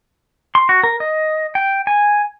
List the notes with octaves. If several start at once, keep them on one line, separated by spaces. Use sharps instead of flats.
C6
F#4
A#4
D#5
G5
G#5